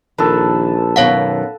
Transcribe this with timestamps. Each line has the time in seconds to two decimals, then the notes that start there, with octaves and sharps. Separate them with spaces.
0.18 A#1 D#3 A4 B4
0.96 F#2 B2 D#3 C#5 F5 F#5